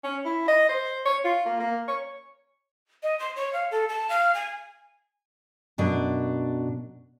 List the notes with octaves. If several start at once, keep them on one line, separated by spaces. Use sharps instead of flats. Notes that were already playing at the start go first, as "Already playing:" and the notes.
C#4
E4
D#5
C5
C#5
F4
A#3
A#3
C#5
D#5
C6
C#5
F5
A4
A5
F5
G#5
F#2 B2 D4